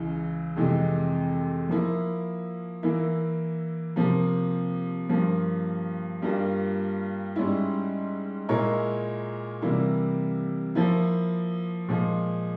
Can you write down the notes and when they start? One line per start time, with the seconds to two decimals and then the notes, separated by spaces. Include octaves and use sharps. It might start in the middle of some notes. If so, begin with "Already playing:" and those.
Already playing: C#2 C#3 E3
0.56 F2 C3 E3 G#3
1.69 F3 A#3 E4
2.83 E3 A#3 E4
3.96 C3 F3 A#3
5.09 G2 F3 A#3
6.22 G2 G3 A#3 F4
7.36 G#2 G3 C#4 E4
8.49 A#2 G#3 E4 A#4 C#5
9.62 C3 E3 G3 A#3 E4
10.75 F3 A#3 E4
11.88 A#2 F3 G#3